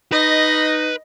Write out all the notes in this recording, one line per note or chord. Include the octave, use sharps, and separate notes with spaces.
D#4 B4 D#5